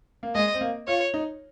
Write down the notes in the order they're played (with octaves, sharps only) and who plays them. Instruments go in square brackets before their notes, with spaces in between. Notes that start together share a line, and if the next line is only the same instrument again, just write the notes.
[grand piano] A#3
[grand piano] G#3 [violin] D#5
[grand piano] C4
A#3
[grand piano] F4 [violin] C#5
[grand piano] D#4